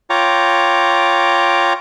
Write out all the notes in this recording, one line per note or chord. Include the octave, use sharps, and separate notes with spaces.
F4 C#5 G5 A#5 D6